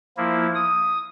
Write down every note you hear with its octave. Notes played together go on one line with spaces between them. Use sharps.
F3 A#3 E4
D#6